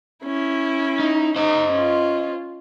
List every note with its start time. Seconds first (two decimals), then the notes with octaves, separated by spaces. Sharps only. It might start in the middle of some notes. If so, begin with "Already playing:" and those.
0.24 C#4 E4
1.00 D#4
1.36 D#4 C5 D#5
1.72 C#4 F4